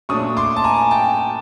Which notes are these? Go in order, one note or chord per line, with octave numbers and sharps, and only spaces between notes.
A#2 F#3 A3 D4 C#6 D#6
C6 D6
A5
G#5 A#5
G5 A5